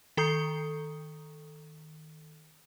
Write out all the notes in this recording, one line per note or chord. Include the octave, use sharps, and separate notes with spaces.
D#3 A4 A#5 D#6 G6 C7